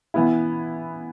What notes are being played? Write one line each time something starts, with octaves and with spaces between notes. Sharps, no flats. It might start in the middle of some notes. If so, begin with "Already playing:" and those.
E3 B3 E4